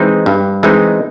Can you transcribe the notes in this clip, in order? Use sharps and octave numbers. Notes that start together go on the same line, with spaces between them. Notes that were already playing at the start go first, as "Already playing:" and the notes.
Already playing: E3 G#3 C4 D#4
G2
E3 G#3 C4 D#4